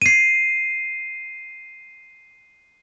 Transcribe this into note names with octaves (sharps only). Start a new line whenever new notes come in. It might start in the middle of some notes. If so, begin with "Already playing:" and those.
C7 D#7